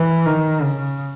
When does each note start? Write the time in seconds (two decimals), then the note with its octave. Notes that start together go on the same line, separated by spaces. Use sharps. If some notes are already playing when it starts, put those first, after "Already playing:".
Already playing: E3
0.26 D#3
0.62 C#3